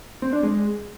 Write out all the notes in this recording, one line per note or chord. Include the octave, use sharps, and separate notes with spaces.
C4
D4
G#3